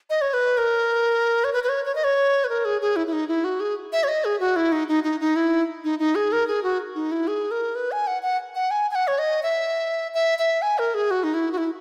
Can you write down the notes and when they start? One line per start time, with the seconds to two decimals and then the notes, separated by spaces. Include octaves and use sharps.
0.10 D#5
0.21 C#5
0.34 B4
0.58 A#4
1.44 C#5
1.53 B4
1.64 B4
1.69 C#5
1.85 C#5
1.95 D#5
2.04 C#5
2.44 B4
2.49 A#4
2.65 G#4
2.81 G#4
2.96 E4
3.07 E4
3.13 D#4
3.28 E4
3.44 F#4
3.60 G#4
3.92 E5
4.04 C#5
4.08 D#5
4.25 G#4
4.40 F#4
4.56 E4
4.72 D#4
4.88 D#4
5.04 D#4
5.20 D#4
5.36 E4
5.84 D#4
5.99 D#4
6.15 G#4
6.32 A#4
6.48 G#4
6.63 F#4
6.95 D#4
7.12 E4
7.28 G#4
7.51 A#4
7.75 B4
7.92 G#5
8.07 F#5
8.23 F#5
8.55 F#5
8.71 G#5
8.91 G#5
8.95 F#5
9.08 C#5
9.19 D#5
9.43 E5
10.14 E5
10.39 E5
10.62 G#5
10.78 A#4
10.94 G#4
11.11 F#4
11.24 D#4
11.34 E4
11.52 F#4
11.58 E4